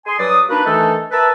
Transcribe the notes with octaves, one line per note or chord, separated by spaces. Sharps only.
G#4 G#5 C6
G2 F#3 B4 D5 D#6
A#3 D4 D#4 F#4 B4
D#3 E3 A3 D4 D#4 A4
A#4 B4 E5 A5